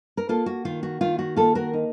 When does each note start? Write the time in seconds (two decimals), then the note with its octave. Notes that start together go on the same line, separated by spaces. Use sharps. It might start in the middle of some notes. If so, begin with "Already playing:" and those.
0.17 A#4
0.29 A#3 F4 A4
0.46 F#4
0.65 D#3 F4
0.83 F#4
1.01 D#3 F4
1.19 F#4
1.36 A#3 F4 A4
1.55 F#4 A#4
1.73 D#4